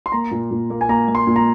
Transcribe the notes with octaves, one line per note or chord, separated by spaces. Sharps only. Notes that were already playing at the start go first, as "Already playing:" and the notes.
C6
A#3 A#5
A#2
A#2
A#3
G#5
A#3 A#5
A#3
C6
A#2
A#5